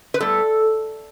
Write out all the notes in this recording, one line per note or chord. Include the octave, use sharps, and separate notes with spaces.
B4
A2 G3 B3 A4